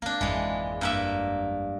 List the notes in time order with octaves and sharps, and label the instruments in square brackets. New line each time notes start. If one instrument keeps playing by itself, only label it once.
[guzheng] A#3 D4 [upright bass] C4
[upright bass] G#1 F2 [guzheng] E3 G#3
[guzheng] G2 A#3 E5